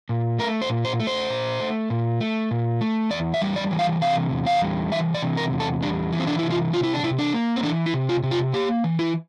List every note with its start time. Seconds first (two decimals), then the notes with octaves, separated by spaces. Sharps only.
0.09 A#2
0.39 A3 A#4
0.62 C5
0.69 A#2
0.85 C5
1.00 A3
1.07 C5
1.30 A#2
1.60 A3
1.90 A#2
2.20 A3
2.51 A#2
2.81 A3
3.10 E2 D5
3.34 E5
3.41 G3
3.56 D5
3.71 E3
3.79 F5
4.01 C3 F5
4.31 E2
4.46 F5
4.62 G3
4.92 E3 E5
5.14 D5
5.22 C3
5.37 A#4
5.52 E2
5.60 A4
5.82 G3 D4
6.13 E3
6.20 C4
6.27 D4
6.39 C3 E4
6.50 F4
6.73 C3 F4
6.83 E4
6.94 D4
7.03 C3 E4
7.19 D4
7.34 A#3
7.56 C4
7.63 E3 D4
7.86 E4
7.94 C3
8.09 F4
8.23 C3
8.31 F4
8.53 A#3 G4
8.84 E3
8.99 E4